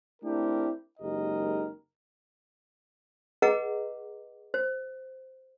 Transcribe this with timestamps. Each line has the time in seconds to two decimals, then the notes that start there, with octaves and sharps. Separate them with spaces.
0.23 A3 C4 D4 E4 G4 A#4
1.00 F#1 G#3 D#4 G4 A#4 D#5
3.42 G#4 B4 D#5 F#5 A#5 D6
4.54 C5